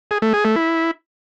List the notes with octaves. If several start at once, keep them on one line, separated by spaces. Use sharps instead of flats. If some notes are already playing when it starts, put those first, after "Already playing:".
G#4
A3
G#4
A3
E4